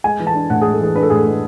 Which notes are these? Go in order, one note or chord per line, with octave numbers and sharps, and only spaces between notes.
G#3 G#5
E3
A5
D4
A2 F#5
G#4
G#3
A4
E3 G#4
D4 B4
A4
A2 G#4
A4
G#3